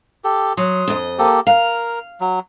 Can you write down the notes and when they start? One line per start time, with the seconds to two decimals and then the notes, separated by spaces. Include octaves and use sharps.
0.24 G4 A4
0.57 F#3 C6 D#6
0.88 F2 D#5
1.19 A#3 G4 A4
1.47 A#4 F5
2.21 F#3